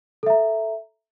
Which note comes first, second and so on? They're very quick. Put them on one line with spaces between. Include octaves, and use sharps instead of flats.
A4 E5 A#5